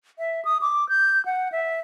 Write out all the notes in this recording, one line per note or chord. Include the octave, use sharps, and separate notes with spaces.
E5
D#6
D6
G6
F#5
E5